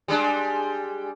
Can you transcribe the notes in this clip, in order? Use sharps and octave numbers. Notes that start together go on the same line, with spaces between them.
G3 G#3 D4